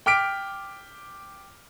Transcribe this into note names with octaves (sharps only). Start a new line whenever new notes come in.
G5 D6 F6 B6 D7